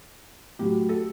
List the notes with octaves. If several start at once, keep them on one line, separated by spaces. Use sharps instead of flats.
A2 F#3 G4
A4